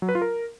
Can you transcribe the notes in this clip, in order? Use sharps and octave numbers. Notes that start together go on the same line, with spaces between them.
F#3
B4
F4
A#4